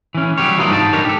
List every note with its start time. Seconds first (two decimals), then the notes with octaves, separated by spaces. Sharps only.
0.14 E3 C#4
0.38 F#3 G3 G4 C#5
0.57 E3 F#3 D4 F4 A#4 D#5
0.71 G#2 D#4 G4 G5 A5
0.93 D4 D#4 A#4 B4 C#5
1.05 G4 A4